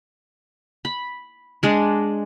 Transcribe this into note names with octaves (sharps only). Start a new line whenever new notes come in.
B5
G#3 D4